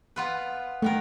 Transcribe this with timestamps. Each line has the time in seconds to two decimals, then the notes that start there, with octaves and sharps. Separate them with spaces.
0.16 B3 F4 B4
0.82 D#3 A3 B3 A#4